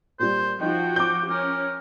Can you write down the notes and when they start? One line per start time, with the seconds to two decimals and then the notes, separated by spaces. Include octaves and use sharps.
0.20 A#2 G3 C5
0.61 F3 D#4 F#4 G5
0.96 D6 G6
1.29 C#4 A#4